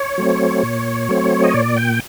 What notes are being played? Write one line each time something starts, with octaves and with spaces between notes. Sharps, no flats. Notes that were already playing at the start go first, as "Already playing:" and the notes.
Already playing: C#5
F#3 A3 C4
A#2
F#3 A3 C4
D#5
A#2 D5
G5